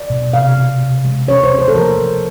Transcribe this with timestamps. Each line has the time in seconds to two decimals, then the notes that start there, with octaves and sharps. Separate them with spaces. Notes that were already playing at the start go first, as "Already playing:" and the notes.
Already playing: D5
0.10 B2
0.33 C3 F5
0.57 C3
0.81 C3
1.05 G#3
1.28 C#4 C#5
1.44 C5
1.52 C#4
1.59 C5
1.68 A4
1.74 F3 A#4
1.98 F3